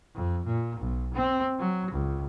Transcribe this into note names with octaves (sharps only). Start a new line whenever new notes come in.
F2
A#2
B1
C4
F#3
C#2